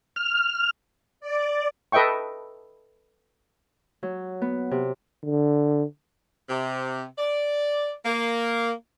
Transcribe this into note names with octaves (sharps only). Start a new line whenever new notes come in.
F6
D5
A4 B4 D#5 E5 G5 C#6
F#3
B3
C3
D3
C3
D5
A#3